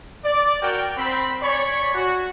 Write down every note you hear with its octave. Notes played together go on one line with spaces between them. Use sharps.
D5
F#4 A#4 G5
C4 B5
C#5 D5 G#5 B5 C#6
F#4